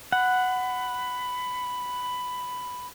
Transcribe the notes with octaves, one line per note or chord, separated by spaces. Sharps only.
F#5 B5